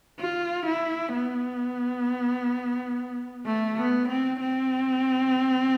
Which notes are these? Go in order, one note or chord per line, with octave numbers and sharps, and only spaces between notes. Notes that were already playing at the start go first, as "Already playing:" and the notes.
F4
E4
B3
A3
B3
C4
C4